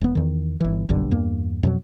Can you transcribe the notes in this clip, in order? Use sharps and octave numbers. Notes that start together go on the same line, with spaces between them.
E1 B3
E2 D#3
G1 E3
F#1 B1 G2 D3
E2 G2 A#3
F2 B2 F#3